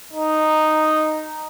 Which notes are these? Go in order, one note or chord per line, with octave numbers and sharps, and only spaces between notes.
D#4